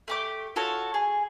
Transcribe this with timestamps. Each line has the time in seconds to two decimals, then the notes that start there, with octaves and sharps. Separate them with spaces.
0.08 A3 G4 D6
0.56 F4 F#4 A4 C#5
0.94 G#4